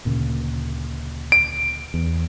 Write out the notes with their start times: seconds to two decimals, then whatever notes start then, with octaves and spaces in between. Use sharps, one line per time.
0.05 D2 A#2 C#3
1.32 D7
1.94 E2